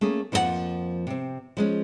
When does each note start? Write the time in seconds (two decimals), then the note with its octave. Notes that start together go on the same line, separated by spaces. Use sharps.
0.01 A3 A#3 C#4 G#4
0.32 F2 F3 A#3 F4 F#5
1.07 C3 C4
1.57 F3 G#3 C#4